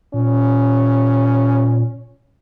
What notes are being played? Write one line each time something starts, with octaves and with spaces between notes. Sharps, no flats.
A#2 C#4